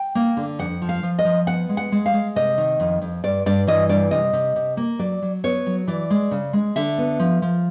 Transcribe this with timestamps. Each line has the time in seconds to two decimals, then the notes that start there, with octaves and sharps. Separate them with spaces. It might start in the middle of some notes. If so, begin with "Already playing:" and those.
Already playing: G5
0.15 A#3
0.37 D3
0.59 F2 F#5
0.82 F3
0.89 F5
1.03 F3
1.19 D#5
1.25 F3
1.47 B3 F#5
1.69 G#3
1.77 F#5
1.92 G#3
2.06 F5
2.13 G#3
2.36 C3 D#5
2.58 D#3
2.80 F2
3.01 F2
3.24 G2 D5
3.46 G2 D5
3.67 E3 D#5
3.89 G2 D5
4.11 C3 D#5
4.33 C3
4.56 C3
4.77 A#3
4.99 F#3 D5
5.22 F#3
5.44 B3 C#5
5.66 F#3
5.87 E3 D5
6.10 G#3
6.31 C#3
6.53 G#3
6.76 D3 E5
6.98 B3
7.20 F3
7.42 F3